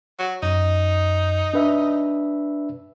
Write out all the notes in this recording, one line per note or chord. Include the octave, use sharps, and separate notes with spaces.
F#3
F#2 D#4
D4 B4 E5